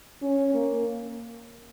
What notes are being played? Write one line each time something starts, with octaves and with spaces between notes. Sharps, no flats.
C#4
A#3